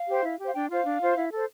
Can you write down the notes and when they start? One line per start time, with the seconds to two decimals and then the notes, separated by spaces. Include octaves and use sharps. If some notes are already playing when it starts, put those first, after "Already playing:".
Already playing: F5
0.09 G4 C5
0.24 E4
0.39 G4
0.44 C5 F5
0.54 D4 G5
0.70 F4 C5 F5
0.85 D4
1.01 F4 C5
1.17 E4
1.32 A4 C5